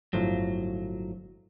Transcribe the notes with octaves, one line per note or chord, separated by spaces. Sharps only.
G1 A2 F3 F#3